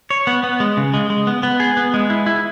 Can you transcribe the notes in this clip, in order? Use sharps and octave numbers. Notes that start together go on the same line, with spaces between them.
C#5
B3
B3
G#3
C#3
G#3
G#3
B3
B3
G#4
B3
G#3
E4
E4